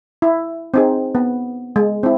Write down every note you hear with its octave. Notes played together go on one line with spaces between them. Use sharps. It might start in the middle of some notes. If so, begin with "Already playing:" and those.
E4
C4 D#4 G#4
B3
G#3
C4 E4